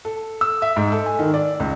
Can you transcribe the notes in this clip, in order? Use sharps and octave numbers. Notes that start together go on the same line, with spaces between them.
A4
E6
E5
G#2
A4
G#5
D#3
D5
C#2